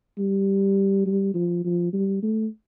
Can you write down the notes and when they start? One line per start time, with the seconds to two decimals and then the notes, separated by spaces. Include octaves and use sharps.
0.18 G3
1.06 G3
1.34 F3
1.64 F3
1.93 G3
2.23 A3